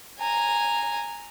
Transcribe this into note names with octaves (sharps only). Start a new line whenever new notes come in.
G#5 A#5